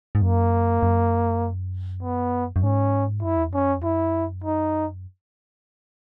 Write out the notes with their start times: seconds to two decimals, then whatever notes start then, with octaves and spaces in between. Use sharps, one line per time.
0.15 G#2
0.22 F#2 A#3
0.83 F#2
2.03 B3
2.56 F#2
2.63 G#2 C#4
3.23 F#2 E4
3.37 E2
3.50 F#2 C#4
3.79 E2
3.83 F#2 E4
4.44 D#4